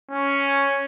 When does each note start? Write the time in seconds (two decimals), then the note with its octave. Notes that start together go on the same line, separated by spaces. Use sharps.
0.11 C#4